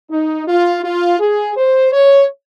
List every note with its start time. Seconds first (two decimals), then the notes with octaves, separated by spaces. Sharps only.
0.10 D#4
0.48 F4
0.84 F4
1.20 G#4
1.57 C5
1.93 C#5